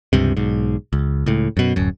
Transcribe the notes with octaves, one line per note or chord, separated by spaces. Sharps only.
C#2 G2 C3
B1 G#2
C#2
C#2 A2
F#2 B2
D1 F#2